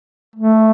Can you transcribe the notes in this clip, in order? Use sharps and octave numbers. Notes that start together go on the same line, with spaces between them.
A3